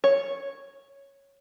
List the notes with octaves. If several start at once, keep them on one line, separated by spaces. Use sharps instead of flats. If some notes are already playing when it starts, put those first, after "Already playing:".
C#5